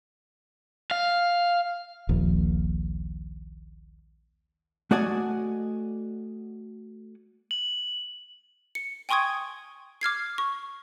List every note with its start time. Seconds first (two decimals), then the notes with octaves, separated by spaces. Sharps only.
0.91 F5
2.09 D#1 A#1
4.91 A3 F#4 D5 D#5 G#5
7.51 F#7
8.75 C#7
9.09 G5 G#5 C6 C#6 D#6 G#6
10.01 D6 F6 G#6 C7
10.38 C#6